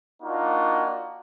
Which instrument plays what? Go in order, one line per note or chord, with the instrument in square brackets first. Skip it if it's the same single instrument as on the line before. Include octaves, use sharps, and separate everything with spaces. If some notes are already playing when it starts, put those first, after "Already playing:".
[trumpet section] A#3 D4 D#4 F4 F#4